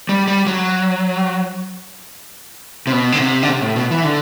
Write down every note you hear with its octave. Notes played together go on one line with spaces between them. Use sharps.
G3
G3
F#3
C3
B2
D3
C3
D3
C3
A2
B2
E3
D3